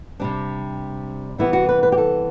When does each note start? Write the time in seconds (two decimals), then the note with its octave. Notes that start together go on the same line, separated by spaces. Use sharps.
0.20 C3 G3 C4 D4
1.38 C3 E3 G3 B3 E4
1.53 F#4
1.69 B4
1.83 B4
1.92 G4
1.98 A4